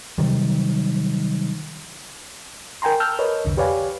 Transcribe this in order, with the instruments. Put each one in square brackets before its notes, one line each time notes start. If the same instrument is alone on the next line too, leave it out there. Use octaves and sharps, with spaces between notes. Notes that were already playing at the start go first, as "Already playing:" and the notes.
[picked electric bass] C3 D#3 F#3 G3
[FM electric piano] A#4 G5 G#5 A#5 C6
A5 E6 F6 G6
A#4 B4 C#5 D#5
C2 F2 D3
G4 B4 C#5 D5 F5 G#5